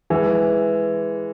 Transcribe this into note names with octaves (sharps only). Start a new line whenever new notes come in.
E3 G#3